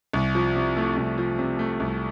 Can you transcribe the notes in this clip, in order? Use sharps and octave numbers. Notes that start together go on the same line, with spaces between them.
C2
F3
C3
A3
C2
F3
C3
A3
C2